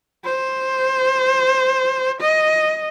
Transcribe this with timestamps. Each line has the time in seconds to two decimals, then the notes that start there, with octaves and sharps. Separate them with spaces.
0.24 C5
2.21 D#5